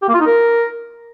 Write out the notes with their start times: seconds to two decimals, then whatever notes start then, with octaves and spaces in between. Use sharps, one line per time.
0.02 G4
0.08 A#3
0.14 F4
0.20 D#4
0.26 A#4